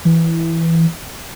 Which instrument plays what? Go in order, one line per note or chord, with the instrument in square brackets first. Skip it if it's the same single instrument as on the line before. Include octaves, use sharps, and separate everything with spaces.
[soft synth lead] E3